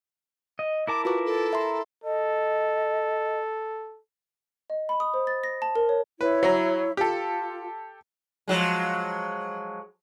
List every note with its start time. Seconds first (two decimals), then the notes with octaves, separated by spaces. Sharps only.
0.59 D#5
0.87 E4 A#4 A5 D6
1.05 F4 F#4 B4 D6
1.25 A4
1.53 E5 A#5 C6
2.04 A4 D#5
4.70 D#5
4.89 B5
5.00 D#6
5.14 C5
5.27 A6
5.44 A#6
5.62 A5
5.75 A#4
5.89 C#5
6.21 E4 B4 C#5
6.43 F#3 A#5
6.97 F4 G4 A4
8.48 F3 F#3 G#3